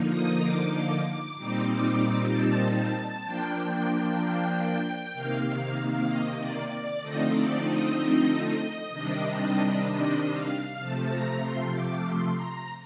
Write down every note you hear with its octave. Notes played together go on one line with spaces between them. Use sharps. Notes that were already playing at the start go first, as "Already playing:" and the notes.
Already playing: D3 F3 A#3 D#4
D#6
D6
A#2 G3 C4 D#4
A5
F3 A#3 D4 G5
C3 D#3 A#3 F5
D#5
D5
D5
D3 F3 A3 C4 D#4 D#5
D5
D#5
C3 D#3 G3 D4
D#5
F5
C3 F3 A3 A5
A#5
C6
D6
C6
A#5